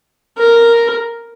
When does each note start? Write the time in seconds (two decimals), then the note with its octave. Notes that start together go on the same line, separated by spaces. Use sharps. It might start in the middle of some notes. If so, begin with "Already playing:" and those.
0.37 A#4